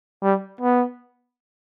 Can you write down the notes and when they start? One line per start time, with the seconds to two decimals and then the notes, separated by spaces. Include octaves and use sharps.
0.23 G3
0.61 B3